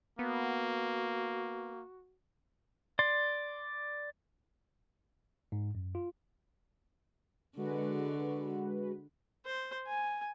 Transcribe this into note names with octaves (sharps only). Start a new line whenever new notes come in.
A#3 B3 F#4
D5 C6
G#2
F#2
F4
D3 G#3 F#4 B4
C5
G#5